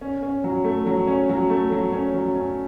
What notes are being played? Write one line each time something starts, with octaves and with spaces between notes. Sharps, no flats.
C#4
C#4
F#3
A3
F#3
C#4
F#3
A3
F#3
C#4
F#3
C#4